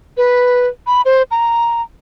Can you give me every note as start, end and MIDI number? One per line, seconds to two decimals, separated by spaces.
0.17 0.67 71
0.87 1.01 83
1.05 1.22 72
1.31 1.82 82